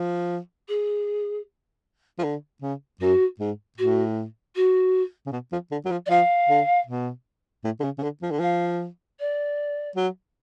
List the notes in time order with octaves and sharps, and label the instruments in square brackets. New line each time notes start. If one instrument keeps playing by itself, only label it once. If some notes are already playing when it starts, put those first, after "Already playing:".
Already playing: [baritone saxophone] F3
[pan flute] G#4
[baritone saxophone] F3
D3
C#3
[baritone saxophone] F#2 [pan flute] F#4
[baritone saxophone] G#2
[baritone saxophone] A2 [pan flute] F#4
[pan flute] F#4
[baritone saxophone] C#3
B2
F3
D3
F#3
F3
[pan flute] D5
[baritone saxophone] F3 [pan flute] F5
[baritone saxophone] D3
B2
A2
D3
C#3
C#3
D3
F3
D3
[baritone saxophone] F3 [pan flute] F5
[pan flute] D5
[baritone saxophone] F#3